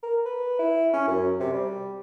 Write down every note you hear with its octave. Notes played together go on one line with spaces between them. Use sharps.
A#4
B4
E4
C#4
F#2
C3
G3